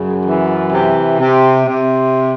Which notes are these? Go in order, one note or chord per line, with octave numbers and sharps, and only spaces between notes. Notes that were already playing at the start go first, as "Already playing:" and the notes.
Already playing: F#2 C#3
E3
C3
C3
C3